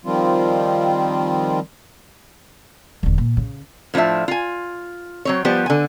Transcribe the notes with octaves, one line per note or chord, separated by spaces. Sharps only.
D#3 F3 G3 C4 F4
E1 D3
A#2
C#3
A2 F3 D4 F4 E5
F4 G#5
F#3 C4 C#5
F3 G3 B3 G4 C5
D3 G#5